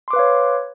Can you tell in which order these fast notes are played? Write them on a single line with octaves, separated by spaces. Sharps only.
C6 D6 B4 F5 C#5